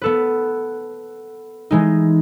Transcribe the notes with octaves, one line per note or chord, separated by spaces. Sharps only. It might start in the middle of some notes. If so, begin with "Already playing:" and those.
B3 A4 B4
E3 G#3 D#4